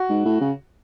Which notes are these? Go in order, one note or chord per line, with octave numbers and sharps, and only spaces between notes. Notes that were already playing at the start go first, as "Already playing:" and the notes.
Already playing: F#4
G#2
A2
C#3